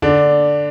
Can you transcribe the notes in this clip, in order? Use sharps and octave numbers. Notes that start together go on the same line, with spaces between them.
D3 D4